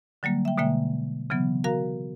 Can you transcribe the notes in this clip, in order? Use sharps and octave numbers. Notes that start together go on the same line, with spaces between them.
D3 F#3 G3 A#3
E5 G5
B2 D3 G#3 A#3 E5 G5
C#3 E3 F#3 B3
F#4 A#4 F5 A#5